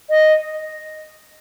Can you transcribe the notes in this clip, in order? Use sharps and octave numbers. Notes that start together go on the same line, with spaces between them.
D#5